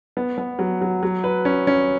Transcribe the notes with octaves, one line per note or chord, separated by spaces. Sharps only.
B3
B3
F#3
F#3
F#3
B4
C#4
C#4